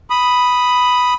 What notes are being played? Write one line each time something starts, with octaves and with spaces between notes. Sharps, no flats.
B5 D#6